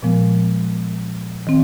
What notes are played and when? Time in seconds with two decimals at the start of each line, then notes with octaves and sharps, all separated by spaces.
0.03 A#2 F3 G#3 B3
1.47 D#3 C4